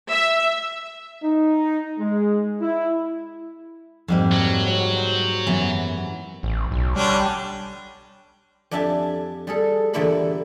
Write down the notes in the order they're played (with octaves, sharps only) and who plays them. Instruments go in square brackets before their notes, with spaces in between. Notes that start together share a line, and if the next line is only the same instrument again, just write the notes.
[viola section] E5
[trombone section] D#4
G#3
E4
[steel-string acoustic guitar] F2 [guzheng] G#2 G3 A#3
[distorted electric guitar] F#3
[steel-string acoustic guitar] F#4 C#5
[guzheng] C5
[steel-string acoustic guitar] F#2 B3 [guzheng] E3
[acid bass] A1
B1
[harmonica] D3 C#4 D4 [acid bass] G3
[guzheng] F2 D4 G4 E5 G#5 A5
G3 G#4 A4
E2 A#2 D3 E4 G4 B5